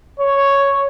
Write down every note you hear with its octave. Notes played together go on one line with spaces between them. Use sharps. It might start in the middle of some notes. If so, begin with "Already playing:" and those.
C#5